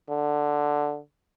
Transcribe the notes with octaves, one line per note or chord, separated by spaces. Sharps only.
D3